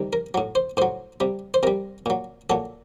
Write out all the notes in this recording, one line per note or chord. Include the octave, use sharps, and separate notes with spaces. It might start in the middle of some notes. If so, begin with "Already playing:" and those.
Already playing: C3 D#3 G3
A#4
A2 F#3
C5
A2 F#3 C5
C3 G3
C5
C3 G3 A#4
A#2 F#3
A#2 F#3 A4